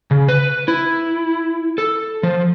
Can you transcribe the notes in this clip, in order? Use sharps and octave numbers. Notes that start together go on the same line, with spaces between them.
C#3
B4
E4
A4
F3